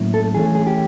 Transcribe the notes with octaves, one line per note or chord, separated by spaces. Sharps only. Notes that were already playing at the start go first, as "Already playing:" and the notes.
Already playing: A2 F#3 A#3 C#4 E4
A4
E3 A3 C#4 G#4
G#4
G4